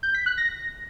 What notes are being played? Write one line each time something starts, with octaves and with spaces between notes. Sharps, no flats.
G6
B6
F#6
A#6